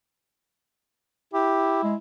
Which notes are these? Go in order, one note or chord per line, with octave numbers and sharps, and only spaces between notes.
E4 G4
G#3